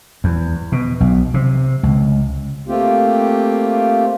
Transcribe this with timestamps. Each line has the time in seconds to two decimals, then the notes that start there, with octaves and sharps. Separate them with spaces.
0.24 E2
0.72 B2
1.00 B1
1.34 C3
1.83 C#2
2.68 A3 A#3 C4 F4 G4